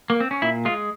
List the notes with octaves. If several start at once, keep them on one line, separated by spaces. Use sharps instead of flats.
A#3
C4
C#4
A#2 E4
G#3 F4